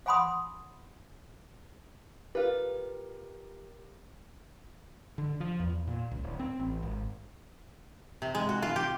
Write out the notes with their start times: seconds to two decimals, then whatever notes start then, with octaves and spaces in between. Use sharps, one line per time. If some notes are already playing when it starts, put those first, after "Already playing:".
0.06 F5 F#5 G#5 B5 C6 D#6
2.35 F4 G4 A#4 B4
5.18 D3
5.40 F3
5.60 E2
5.87 A#2
6.11 C#2
6.24 D1
6.39 C4
6.60 A1
6.83 G#1
8.22 C3
8.35 G#3
8.49 F#4
8.62 F4
8.76 G4